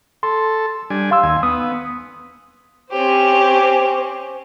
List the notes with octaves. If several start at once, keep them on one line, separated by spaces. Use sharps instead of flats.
A4 C6
G3 D4 G#5
F5 C6 E6
D#2 G#5
B3 D#6
C4 C#4 G4 C5